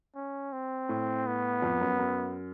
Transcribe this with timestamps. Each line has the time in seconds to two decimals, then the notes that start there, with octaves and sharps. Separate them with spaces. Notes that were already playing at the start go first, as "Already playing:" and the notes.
0.16 C#4
0.52 C4
0.89 A2
1.26 B3
1.62 F2
1.81 F#2
1.99 F#2